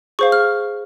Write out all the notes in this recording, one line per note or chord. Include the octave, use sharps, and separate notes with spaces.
G#4 C5 F5 C#6
F6